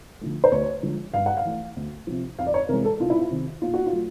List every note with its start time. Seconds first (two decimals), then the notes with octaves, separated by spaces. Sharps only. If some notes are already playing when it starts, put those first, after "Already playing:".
0.21 D3 F3 A3
0.44 C5
0.52 D2 C#5
0.83 D3 F3 G#3
1.14 G2 F5
1.26 F#5
1.37 F5
1.45 E3 A3
1.77 D2
2.07 C3 F3
2.38 F2 F5
2.47 D5
2.54 C#5
2.69 C3 E3 G#3 A#4
2.84 A4
3.00 C2 F4
3.10 E4
3.19 F4
3.31 C3 D#3
3.62 A#2 F4
3.74 F#4
3.86 F4
3.93 F#3 A3